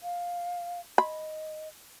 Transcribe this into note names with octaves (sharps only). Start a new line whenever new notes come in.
F5
D#5 B5